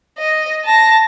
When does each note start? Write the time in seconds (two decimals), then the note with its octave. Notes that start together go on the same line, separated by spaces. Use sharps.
0.19 D#5
0.65 A5 A#6